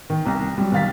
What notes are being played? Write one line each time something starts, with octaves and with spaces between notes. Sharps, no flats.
D#3
C2 A#5
F#3 G3
C2 D#3 F5 A6 B6